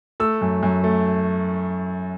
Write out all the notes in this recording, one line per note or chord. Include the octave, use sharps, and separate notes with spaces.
A3 E6
F#2
F#2
A3